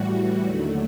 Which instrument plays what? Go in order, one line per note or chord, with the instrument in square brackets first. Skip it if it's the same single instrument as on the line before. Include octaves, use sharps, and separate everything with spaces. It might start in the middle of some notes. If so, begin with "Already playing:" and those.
Already playing: [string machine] A2 E3 G3 F#4
D#2 D3 F#3 A3